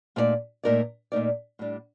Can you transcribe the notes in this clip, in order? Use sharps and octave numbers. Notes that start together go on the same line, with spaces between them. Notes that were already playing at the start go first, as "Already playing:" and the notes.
A#2 A3 D#4 A#4 D5
A#2 A3 D#4 A#4 D5
A#2 A3 D#4 A#4 D5
A2 G3 D4